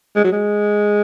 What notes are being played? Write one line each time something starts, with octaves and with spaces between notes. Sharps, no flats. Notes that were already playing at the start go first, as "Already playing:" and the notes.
G#3
F#3
G#3